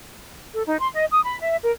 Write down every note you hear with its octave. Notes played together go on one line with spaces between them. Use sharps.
A4
D#4
C6
D#5
D#6
B5
E5
A#4